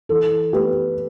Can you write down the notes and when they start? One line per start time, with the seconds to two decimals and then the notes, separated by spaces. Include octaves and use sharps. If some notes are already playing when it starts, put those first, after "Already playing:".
0.09 E3 A4
0.53 A3 G4 B4